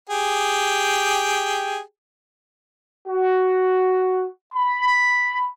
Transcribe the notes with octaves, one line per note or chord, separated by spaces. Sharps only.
G4 G#4 G5
F#4
B5